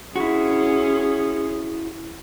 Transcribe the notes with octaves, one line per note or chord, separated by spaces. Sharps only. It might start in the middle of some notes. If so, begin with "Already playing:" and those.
C#4 E4 F#4 G#4